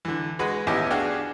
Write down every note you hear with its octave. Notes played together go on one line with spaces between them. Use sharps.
D3 E3
G#3 F#4 G#4 B4
A1 D#2 B3 E4 G4 D#5
D4 F#4 G#4 D5 F5 G5